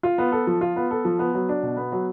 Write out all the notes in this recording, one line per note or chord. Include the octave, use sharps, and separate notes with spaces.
F4
B3
A4
F3
F4
B3
A4
F3
B3
F#3
D4
B2
B3
F#3